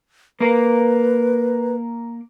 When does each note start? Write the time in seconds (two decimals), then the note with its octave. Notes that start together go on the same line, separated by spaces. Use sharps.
0.40 A#3 A#4 B4